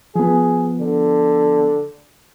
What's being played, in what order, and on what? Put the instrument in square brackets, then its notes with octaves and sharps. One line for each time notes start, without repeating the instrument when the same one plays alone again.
[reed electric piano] F3 B3 [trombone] G#4
[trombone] D3